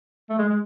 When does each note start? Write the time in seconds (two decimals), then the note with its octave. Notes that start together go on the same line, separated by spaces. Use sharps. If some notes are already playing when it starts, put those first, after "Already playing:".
0.30 A3
0.38 G#3
0.49 G#3